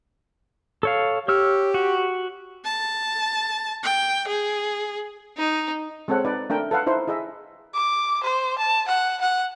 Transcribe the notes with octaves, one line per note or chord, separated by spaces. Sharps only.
A4 C#5 F5
G4 C#5 E6 F6
F#4
A5
G5
G#4
D#4
G#3 C4 A4 C#5 F#5
D#4 B4 D5
A3 D4 A#4 G5
A4 B4 F5 F#5
D#4 E4 C5
E4 G#4 D#5 E5
D6
C5
A5
F#5
F#5